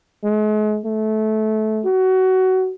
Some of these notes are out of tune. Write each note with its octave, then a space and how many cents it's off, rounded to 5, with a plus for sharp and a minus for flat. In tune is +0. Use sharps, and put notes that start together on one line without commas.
G#3 +40
A3 -20
F#4 +20